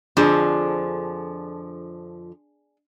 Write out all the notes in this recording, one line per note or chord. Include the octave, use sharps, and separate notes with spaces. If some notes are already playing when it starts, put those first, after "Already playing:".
F2 D3 F3 D4 G#4